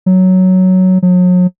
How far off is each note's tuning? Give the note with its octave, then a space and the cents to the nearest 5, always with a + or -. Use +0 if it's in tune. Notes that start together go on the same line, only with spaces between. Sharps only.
F#3 +5
F#3 -40